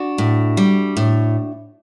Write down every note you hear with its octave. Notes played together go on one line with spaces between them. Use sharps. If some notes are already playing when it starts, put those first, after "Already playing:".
Already playing: D4 F#4
A2
G3
A2